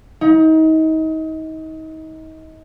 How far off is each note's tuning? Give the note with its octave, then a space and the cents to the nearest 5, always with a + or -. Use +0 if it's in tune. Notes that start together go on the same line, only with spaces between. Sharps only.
D#4 +30